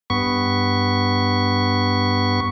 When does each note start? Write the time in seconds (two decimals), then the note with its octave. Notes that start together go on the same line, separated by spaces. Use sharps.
0.10 G2 B3 C#6